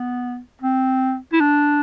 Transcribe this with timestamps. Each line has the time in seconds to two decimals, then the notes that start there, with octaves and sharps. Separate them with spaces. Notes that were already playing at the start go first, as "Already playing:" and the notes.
Already playing: B3
0.61 C4
1.33 E4
1.40 D4